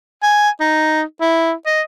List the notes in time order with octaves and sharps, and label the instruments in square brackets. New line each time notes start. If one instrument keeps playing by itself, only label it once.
[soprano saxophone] G#5
D#4
E4
D#5